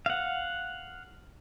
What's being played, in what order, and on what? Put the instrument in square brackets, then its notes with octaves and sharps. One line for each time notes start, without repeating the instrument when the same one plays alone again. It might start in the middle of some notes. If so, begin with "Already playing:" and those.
[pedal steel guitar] F5 F#5